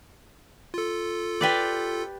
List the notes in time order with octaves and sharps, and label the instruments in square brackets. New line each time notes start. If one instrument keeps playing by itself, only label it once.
[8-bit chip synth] F4 A4
[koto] G4 B4 D5